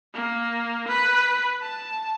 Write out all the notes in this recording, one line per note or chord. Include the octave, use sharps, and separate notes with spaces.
A#3
B4
A5